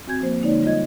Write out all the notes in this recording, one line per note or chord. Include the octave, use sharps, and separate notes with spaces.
C4 F#4 G#5 G6 G#6
F3 A#3 C5
D3 G#3 A#3 D#4 C#5 D5
G3 F4 C#5 D#5 G#6